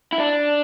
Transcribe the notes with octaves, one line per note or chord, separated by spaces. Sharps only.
E4
D4